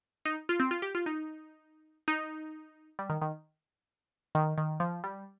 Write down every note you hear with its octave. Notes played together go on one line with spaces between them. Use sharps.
D#4
F4
C4
F4
G4
F4
D#4
D#4
G3
D#3
D#3
D#3
D#3
F3
G3